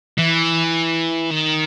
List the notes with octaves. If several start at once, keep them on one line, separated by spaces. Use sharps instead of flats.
E3
D#3